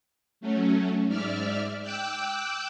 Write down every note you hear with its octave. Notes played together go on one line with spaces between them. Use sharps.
F#3 A3 C#4
G#2 D5 E5 F6
G5 D6 E6 F#6 G6